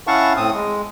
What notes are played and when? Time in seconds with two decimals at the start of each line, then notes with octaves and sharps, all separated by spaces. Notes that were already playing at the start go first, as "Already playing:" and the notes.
0.07 C#4 E4 F5 F#5 A5 C#6
0.37 A2 C4 D#6
0.54 G#3